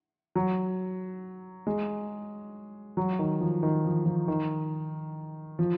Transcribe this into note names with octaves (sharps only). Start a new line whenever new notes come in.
F#3
G#3
F#3
D#3
F3
D#3
F3
F3
D#3
F3